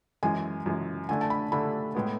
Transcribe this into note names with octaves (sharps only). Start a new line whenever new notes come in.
F#2 E3 G#3 G#5
F#2 E3 G#3
D3 A3 D4 G#5
A5
B5
D3 A3 D4 B5
A2 G#3 B3